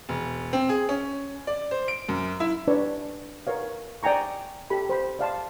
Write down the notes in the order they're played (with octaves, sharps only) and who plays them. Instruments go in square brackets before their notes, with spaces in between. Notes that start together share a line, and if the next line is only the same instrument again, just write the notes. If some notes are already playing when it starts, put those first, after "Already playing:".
[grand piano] E1
C4
G#4
C#4
D5
C5
D7
F#2
E4
[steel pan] D4 B4 C#5 D5
A#4 B4 C#5 F5
D5 G5 G#5 A#5 C#6
G4 A4 B5
C5 B5
D5 F5 A5 C6